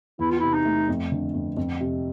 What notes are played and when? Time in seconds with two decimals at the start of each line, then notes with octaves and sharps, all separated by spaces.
0.19 E2 E4
0.30 F4
0.40 C3 E4
0.53 D#4
0.65 A3
0.88 F2
1.12 D3
1.34 F2
1.57 F2
1.81 C3